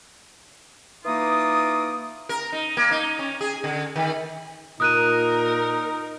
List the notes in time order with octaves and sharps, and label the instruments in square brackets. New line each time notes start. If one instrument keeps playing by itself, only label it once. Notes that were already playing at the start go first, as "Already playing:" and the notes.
[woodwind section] E3 A#3 D#4 F4 D6 D#6
[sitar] A#4
D#4
A#3
D#4
C#4
G#4
D3
D#3
[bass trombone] A#2 [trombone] D#4 [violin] A#4 [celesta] D#6 F#6 D#7